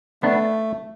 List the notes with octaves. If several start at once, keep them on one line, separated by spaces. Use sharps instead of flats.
A3 B3 D4